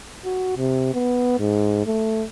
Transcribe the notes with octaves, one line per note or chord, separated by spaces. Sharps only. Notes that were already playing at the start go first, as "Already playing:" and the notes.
F#4
C3
B3
G#2
A3